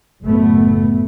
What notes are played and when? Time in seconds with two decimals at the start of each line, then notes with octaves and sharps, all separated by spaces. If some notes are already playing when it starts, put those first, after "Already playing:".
0.22 F#1 A2 A3 B3